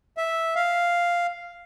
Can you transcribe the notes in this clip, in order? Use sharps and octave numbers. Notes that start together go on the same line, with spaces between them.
E5
F5